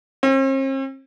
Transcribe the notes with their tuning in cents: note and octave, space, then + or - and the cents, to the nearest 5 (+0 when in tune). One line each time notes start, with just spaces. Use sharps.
C4 +45